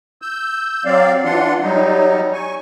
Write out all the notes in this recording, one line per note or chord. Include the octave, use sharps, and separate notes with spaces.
E6 G6
F#3 C4 D5 F5
E3 D4 F4 F#5 C6
F#3 G3 D#4
G#5 C#6